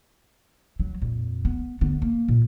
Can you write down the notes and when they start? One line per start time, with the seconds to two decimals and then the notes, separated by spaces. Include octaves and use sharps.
0.79 F#3
1.02 F2 A#2
1.45 B3
1.81 D3 B3
2.02 A#3
2.28 A#2